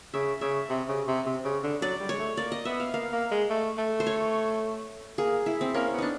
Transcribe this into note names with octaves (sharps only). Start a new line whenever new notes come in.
C#3 E5
C#3 E5
C3
C#3
C3
C3
C#3
D3
F#3 D5
G3
G#3 C#5
A3
A#3 D5
D#5
B3 E5
F5
A#3 F5
A#3
G#3
A3
A3
C5
C#5
A#3 G#4
E4
C4
A#3 C#4
B3
D4 D#4